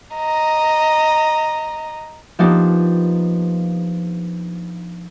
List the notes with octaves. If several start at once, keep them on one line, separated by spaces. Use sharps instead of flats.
D#5 A#5
F3 A#3 B3 D4 D#4 G4